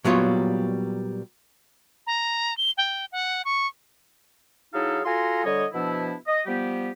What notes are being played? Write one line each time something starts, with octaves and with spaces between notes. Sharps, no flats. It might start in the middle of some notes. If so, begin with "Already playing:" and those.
A#2 F#3 G3 B3 F4 C#5
A#5
G7
G5
F#5
C#6
F#3 D#4 E4 G#4 A4 F5
F4 F#4 A4 G#5 A#5 C6
D3 G3 C#5 D#5
B2 F3 B3 D4 E4
D#5
F3 G3 B3 G4